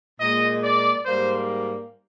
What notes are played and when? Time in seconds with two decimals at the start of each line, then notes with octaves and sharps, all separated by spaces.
0.21 A#2 G#3 D#5
0.63 D5
1.05 G#2 G3 A#3 C5